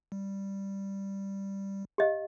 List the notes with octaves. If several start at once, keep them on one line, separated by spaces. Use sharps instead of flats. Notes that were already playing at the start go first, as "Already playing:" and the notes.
G3
G4 D#5 F5